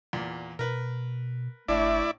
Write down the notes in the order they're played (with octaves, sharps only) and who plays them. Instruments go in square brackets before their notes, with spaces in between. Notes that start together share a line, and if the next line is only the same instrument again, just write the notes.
[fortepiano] E2 A#2
[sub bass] B2 [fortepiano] A#4 B4
[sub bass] G1 [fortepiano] A2 D4 [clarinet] A3 [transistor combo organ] E4 D5